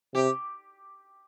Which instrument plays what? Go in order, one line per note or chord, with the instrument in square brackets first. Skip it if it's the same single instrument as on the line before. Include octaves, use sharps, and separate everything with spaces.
[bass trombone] C3 [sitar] G4